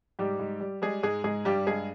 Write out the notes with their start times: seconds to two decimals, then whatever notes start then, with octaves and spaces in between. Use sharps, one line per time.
0.19 G#2 G3 G4
0.40 G#2
0.60 G3
0.82 G3 G#3 G#4
1.03 G#2 G#3 G#4
1.24 G#2 G#3 G#4
1.45 G2 G3 G4
1.66 G2 G#3 G#4